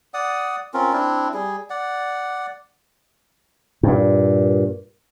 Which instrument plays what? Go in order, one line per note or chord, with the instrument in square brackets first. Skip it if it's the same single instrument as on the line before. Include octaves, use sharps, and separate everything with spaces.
[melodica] D5 F#5 D#6
C4 C#4 F4 A#4
C4 D4 E4
G3 G#4
D5 F#5
[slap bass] G2 A#2